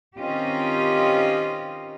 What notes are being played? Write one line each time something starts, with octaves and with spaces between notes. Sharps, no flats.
D#3 C4 C#4 F4 G4 D#5